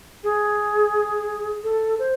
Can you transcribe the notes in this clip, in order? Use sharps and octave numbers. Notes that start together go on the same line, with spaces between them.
G#4
A4
C5